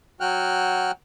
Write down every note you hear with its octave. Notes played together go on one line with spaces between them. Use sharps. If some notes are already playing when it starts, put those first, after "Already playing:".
F#3 F#4 G5 F6 F#6